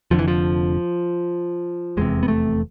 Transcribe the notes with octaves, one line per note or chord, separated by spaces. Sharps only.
F1 F2 D3 F3
E3
F3
F1 E2 C3 G#3
B3
A3